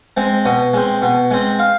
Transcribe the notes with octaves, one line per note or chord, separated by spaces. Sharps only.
G#3 C4
B2 D#5
G#3 C4
B2
G#3 C4
F5